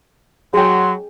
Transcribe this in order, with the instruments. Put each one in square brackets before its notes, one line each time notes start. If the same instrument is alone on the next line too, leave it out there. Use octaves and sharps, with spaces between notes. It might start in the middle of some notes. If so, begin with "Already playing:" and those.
[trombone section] F#3 [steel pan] G#4 G5 [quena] C6